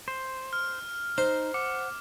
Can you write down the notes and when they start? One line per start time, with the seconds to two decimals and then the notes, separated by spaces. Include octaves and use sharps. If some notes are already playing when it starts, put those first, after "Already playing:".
0.08 C5
0.53 F6
1.18 D#4 C5
1.54 F#5 D6